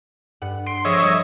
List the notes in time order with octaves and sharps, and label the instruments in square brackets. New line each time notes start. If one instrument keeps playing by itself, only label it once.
[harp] G2 F#5
[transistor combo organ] C6 [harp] D7
[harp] F3 G#4 [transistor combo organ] C#5 D#5 E5
[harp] G3